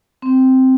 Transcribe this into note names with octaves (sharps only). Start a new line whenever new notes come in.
C4